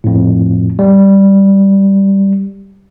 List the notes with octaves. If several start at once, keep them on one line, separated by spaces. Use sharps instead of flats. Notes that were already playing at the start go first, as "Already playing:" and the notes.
F2 A2
G3